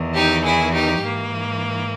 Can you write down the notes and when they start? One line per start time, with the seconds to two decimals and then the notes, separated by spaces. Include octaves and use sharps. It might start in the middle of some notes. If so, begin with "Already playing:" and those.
Already playing: E2 D#3
0.13 D#4 G4
0.44 E4 G#4
0.74 D#4 G4
1.03 G#2 E3 A#3